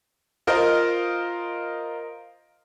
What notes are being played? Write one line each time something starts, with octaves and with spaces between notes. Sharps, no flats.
F4 A#4 C5 D#5 F5